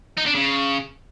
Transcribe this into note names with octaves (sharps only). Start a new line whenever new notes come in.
D#4
D4
C#3